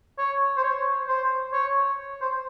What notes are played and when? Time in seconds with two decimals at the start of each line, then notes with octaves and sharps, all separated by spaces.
0.19 C#5
0.57 C5
0.64 C#5
1.08 C5
1.53 C#5
2.22 C5